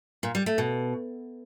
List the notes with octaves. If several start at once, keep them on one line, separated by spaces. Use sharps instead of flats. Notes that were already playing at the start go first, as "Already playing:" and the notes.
A#2
G3
A3
B2